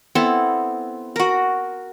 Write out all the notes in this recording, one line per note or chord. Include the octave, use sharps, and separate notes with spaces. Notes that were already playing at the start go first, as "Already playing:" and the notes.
B3 C4 E4 A4
F#4 A#4